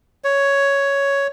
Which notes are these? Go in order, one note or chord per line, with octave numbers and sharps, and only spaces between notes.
C#5